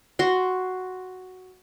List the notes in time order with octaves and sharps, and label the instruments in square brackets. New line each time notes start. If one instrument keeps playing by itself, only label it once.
[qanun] F#4 C6